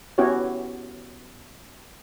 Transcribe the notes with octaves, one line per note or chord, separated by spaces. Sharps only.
B3 C#4 E4 F#4 G4 C#5